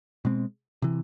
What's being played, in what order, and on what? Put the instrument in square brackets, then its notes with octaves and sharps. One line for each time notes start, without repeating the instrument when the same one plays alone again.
[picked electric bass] B2 G#3 C4
C3 E3